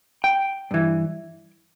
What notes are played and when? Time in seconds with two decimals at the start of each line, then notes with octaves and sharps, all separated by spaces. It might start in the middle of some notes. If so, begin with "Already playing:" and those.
0.24 G5
0.71 G2 E3